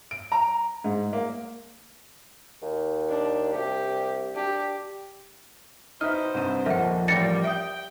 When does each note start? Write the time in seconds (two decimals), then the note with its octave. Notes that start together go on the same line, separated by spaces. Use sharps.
0.11 D7
0.32 A#5
0.84 G#2
1.13 A#3
2.62 D#2
3.09 D4
3.53 C2 G4
4.36 D4 G4
6.01 D#4 B4 C5 D#5 E5 F6
6.34 C2 G2 D#7
6.66 D#1 D#2 F3 A#4 E5 F#5
7.08 A1 G3 F4 G5 A6 A#6 C#7
7.44 E5 G5 D#6 D7